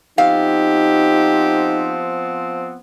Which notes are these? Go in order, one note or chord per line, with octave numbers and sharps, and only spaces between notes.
F3 B3 C4 D#4 G4 F5